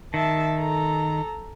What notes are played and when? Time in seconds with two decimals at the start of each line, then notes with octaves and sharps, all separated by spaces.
0.14 D#3 E5 A5
0.59 A4 A#5